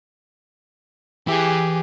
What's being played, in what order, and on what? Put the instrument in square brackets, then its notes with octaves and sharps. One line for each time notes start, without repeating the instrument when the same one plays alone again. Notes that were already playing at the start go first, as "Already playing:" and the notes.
[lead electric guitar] E3 [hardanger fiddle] G4 G#4